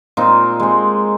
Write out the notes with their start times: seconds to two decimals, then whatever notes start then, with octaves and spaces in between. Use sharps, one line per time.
0.17 A#2 C4 D#4
0.60 G#3 C4